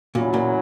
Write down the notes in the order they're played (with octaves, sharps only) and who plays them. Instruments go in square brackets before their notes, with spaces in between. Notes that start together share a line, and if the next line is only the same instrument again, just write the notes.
[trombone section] E2 C#3 F#3 C#4 E4 [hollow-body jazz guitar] A#2
[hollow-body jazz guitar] A#2